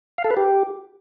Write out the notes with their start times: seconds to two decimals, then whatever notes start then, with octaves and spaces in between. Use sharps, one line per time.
0.18 F5
0.24 A4
0.31 B4
0.37 G4